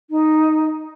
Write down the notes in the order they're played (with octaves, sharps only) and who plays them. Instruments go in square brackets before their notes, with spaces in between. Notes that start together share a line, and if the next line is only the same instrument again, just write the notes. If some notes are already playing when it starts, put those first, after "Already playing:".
[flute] D#4